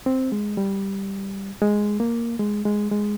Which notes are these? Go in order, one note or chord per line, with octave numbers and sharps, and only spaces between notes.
C4
G#3
G3
G#3
A#3
G#3
G#3
G#3